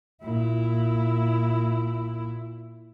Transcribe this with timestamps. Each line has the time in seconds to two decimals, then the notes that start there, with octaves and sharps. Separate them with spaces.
0.22 A#2 E4